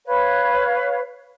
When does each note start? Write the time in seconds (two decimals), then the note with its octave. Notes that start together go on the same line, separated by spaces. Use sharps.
0.06 B4 C#5 F5